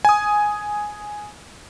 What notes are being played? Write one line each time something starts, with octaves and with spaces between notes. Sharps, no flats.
G#5 D#6